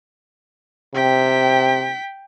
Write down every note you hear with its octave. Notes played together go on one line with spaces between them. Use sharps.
C3 G5 B6